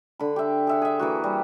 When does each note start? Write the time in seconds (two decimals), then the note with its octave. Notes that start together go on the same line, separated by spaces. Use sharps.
0.19 D3 B5
0.36 G4 E5
0.67 G#4 E5 F#5
0.82 G#4 E5
0.99 E3 A#3 F#4
1.24 G3